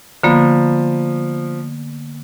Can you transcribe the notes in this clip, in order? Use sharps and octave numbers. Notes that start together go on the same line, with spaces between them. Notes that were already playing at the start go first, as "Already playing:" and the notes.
D3 F3 A#3 B3